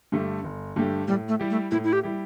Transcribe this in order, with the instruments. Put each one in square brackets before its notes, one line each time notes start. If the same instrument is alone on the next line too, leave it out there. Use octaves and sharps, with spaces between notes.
[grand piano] G2 D3 A3 G4
G1
G2 D3 A3 G4
[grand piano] A2 [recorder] G3
[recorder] A3
[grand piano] G3 E4 G4
[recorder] A3
[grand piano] A2 [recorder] E4
[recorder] E4
G4
[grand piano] G3 E4 G4